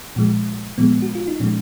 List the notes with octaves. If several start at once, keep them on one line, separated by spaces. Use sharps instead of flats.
A#2 F3 G#3
A#2 F3 G#3 B3
F#4
F4
D#4
A#2 F3 G#3 C#4